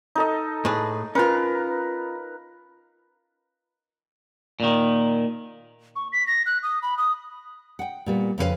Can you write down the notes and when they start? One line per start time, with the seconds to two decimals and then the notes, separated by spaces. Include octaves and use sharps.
0.15 D#4 A4 D#5
0.65 A2 G#4 B4
1.15 C#4 F4 A#4 B4
4.60 A#2 D#3
5.96 C#6
6.13 B6
6.27 A#6
6.46 F#6
6.63 D#6
6.82 B5
6.98 D#6
7.79 F#5 G5
8.06 A#2 G3 B3
8.38 F2 C#3 C#4 D#4 B4 F5